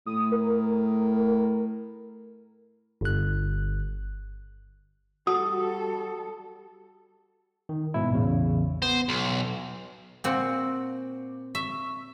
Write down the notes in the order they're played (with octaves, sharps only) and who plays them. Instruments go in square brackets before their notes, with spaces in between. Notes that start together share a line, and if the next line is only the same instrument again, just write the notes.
[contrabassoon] A2 [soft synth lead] D#6
[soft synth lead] A#4
[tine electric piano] G1 F#6
[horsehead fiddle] G3 A4 [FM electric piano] F#4 [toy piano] D#6
[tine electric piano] D#3
G#2 B2 E4
A1 E2 C#3
[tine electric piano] B3 [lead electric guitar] C5
[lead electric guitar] B1 [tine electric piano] C6
[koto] A#2 C4 F#4 [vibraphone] D6
[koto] E5 [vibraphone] C#6